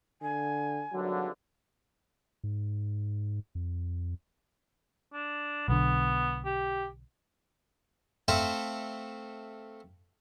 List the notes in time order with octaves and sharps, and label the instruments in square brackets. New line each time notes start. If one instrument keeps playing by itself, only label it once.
[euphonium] D3 [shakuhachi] G#5
[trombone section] G#1 G2 D3 [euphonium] F#3
[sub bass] G#2
F2
[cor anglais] D4
[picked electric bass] B1 D3 [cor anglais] B3
[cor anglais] G4
[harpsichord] A3 C4 A4 C5 E5 F5